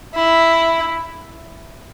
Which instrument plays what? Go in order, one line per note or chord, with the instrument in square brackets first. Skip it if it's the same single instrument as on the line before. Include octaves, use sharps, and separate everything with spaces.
[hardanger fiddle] E4